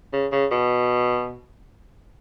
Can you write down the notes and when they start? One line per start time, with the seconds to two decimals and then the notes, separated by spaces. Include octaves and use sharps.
0.13 C#3
0.32 C#3
0.51 B2